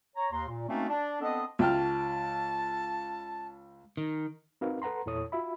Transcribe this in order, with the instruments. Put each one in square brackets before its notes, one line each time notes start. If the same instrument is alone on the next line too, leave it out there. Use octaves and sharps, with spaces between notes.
[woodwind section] C#5 A#5
D#2 A#5 C6
A#2
A3 A#3 C4 C#4 D#4 F#4
D4
B3 C4 D4 A4 D#5
[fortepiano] C#2 G5 F6 [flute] A5
[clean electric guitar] D#3
[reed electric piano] C4 D#4 F#4 A#4 B4 F5
A4 B4 F#5 A#5 C6
E2 A#2 E4 A4 C#5 D#6
F4 F#4 E5 B5